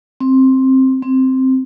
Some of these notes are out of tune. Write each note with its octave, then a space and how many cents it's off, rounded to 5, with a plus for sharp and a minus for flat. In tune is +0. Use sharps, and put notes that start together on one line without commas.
C4 +10
C4 +0